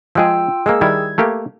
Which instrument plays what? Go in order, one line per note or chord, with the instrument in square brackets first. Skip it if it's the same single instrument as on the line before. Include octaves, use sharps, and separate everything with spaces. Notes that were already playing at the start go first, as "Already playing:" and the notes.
[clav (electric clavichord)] F3 G#3 G#4 [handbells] F4 G5 E6
[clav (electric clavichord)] G#3 A#3 [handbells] G#4 E6
[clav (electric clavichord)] D#3 G3 E4 [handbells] G#6
[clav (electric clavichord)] A3 A#3 G4